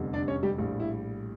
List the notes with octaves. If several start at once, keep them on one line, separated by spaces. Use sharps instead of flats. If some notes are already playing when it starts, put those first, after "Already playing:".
Already playing: F1 E2 D3 G3
D4 D5
C#4 C#5
G3 G4
A#1 A2 G3
E4